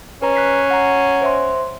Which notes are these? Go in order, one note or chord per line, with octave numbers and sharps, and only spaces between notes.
C#4 B4 A#5
F#6 B6 C7
F#5 A#5
C5 E5 C6